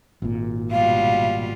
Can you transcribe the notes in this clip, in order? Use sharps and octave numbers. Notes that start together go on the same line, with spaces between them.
G#1 A#2
B2 G3 F4 F5